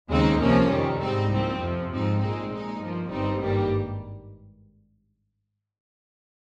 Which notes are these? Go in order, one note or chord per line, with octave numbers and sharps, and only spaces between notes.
D#2 C#3 G#3 C4 D#4
C#2 C3 F3 A#3 C#4
F2 C3 D#3 G3
G#2 G3 C4 D#4
C2 A#2 F3 C4
F2 C3 F3
G#2 F3 C4 D#4
A#1 A#2 G#3 C4 D#4
A#2 G#3 D#4
G2 F3 A#3
G1 G2 G3 C4 D#4
G#1 G2 D#3 G3 A#3